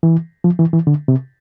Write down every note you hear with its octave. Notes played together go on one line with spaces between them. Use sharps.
E3
F3
E3
E3
D3
C3